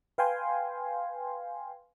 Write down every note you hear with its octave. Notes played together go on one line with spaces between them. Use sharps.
B4 F5 G5 G#5 C6